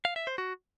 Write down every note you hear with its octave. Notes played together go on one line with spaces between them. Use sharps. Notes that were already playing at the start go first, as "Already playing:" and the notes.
F5
E5
C5
F#4